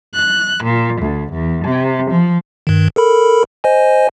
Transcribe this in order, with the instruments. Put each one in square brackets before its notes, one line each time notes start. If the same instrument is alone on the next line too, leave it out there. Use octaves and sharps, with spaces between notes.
[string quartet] F#6
A#2
D2
E2
C3
F3
[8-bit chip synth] G2 D#3
A4 A#4 B5
C5 D#5 G#5